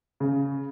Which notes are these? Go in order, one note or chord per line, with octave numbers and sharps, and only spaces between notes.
C#3